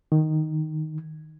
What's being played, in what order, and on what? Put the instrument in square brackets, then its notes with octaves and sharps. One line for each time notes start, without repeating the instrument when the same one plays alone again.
[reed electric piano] D#3